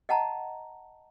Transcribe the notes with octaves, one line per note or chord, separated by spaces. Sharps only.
D#5 F#5 A5 A#5